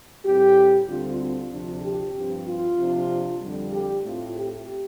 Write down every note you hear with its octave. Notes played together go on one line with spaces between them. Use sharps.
A2 G3 C4 G4
D2 D3 G3 C4 F4
F4
D2 C3 F3 D4
G4
G2 F3 C4
F4
C3 F3 D4
F2 D3 G3
G4
A2 A3 C4 F4
G4